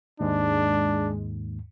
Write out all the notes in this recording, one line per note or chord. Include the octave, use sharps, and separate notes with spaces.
D#2 G#2 G#3 D4